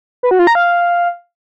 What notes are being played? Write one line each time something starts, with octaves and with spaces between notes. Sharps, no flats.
B4
F#4
F4
A#5
F5